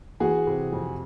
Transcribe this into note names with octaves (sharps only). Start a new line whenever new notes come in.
E3 F#4 G#4
C3
F2